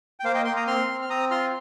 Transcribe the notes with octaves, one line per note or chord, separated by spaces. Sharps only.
G5
A#3 C5 F5
D#5 G5
A#3 G5 C6
A#5 D#6
C4 C6 F6
C4
F6
C4 A#5 D#6
F4 C6 F6